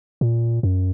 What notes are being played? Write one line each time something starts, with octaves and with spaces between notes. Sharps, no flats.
A#2
F#2